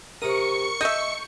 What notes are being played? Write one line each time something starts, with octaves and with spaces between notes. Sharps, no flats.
C3 A#4 C#6 D#6 C#7
D#4 A4 D#5 E5 G6